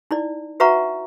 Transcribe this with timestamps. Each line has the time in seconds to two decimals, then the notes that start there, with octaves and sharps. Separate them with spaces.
0.11 D#4 E4 D5
0.60 F#4 B4 E5 F#5 A#5 C#6